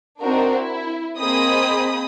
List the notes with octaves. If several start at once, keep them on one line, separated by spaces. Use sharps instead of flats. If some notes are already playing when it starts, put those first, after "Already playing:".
C4 D4 D#4 F#4 A#4
E4
A#3 C4 G#4 D#5 B5 D#6